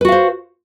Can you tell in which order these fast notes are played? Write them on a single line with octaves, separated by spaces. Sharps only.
B4 F#4 F5 C5